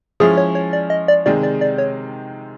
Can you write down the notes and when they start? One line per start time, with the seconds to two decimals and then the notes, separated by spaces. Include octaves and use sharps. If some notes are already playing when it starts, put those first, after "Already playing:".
0.20 F3 G#3 C#4 E4 G#4
0.38 C#5
0.55 C#5
0.73 D5
0.90 D#5
1.08 D5
1.26 C3 D#3 G#3 D5
1.43 D5
1.61 D5
1.78 C#5